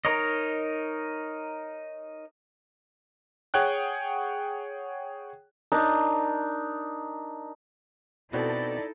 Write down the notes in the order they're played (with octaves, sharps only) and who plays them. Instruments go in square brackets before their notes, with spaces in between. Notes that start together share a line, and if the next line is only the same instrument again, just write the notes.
[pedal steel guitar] D#4 A#4 C#5 D#5
[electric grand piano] G#4 C#5 F#5 G5 F#6
[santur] D4 D#4 A#4
[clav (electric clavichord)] B2 B3 C4 [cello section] D#4 E4 A4 [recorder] D5